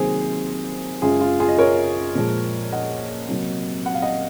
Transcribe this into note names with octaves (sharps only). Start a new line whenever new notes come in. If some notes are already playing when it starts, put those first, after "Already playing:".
Already playing: C3 D#3 F#3 A#3 G#4 C5
F#2 C#3 G#3 F4 G#4
F4
F4 G#4
D#5
A#4 C#5
A#2 F3 G#3
D#5 F#5
C3 F#3 A#3
F#5
F5
D#5 F#5